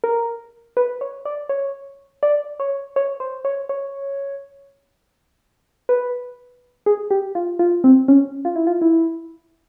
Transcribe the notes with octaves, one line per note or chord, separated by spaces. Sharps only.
A#4
B4
C#5
D5
C#5
D5
C#5
C#5
C5
C#5
C#5
B4
G#4
G4
F4
F4
C4
C#4
F4
E4
F4
E4